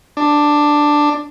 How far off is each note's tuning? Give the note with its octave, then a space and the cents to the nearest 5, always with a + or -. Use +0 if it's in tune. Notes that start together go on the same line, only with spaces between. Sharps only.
D4 +5